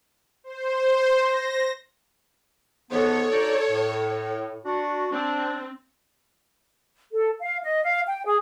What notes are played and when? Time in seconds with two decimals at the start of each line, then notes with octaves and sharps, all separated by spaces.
0.44 C5
1.18 A#6
2.92 G#2 E3 B3 A4 C#5
3.31 D2 D#4 D5
3.70 A2
4.65 D4 F#4
5.12 C4 D4
7.12 A4
7.40 F5
7.64 D#5
7.85 F5
8.07 G5
8.26 G#4